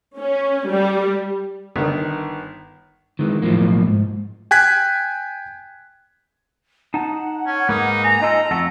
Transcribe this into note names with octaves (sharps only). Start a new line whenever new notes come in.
C#4
G3
G1 D#3
D#3 E3 G#3
B1 A2 E3 F3 A#3
G#2
G5 G#5 F#6 G#6 B6
D#4 F#5 A5
C#4
G#2 A#3 D#4 B4
G#5 A#5
D#4 F4 A4 D#5
F2 A3 A4 F#5